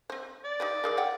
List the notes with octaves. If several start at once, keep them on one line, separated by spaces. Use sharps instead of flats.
C4 C5
D5
D#4 G4 B4
E3 G#4 A#4
C#5 F#5 G5